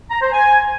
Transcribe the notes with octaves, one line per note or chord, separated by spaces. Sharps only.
A#5
C5
G#5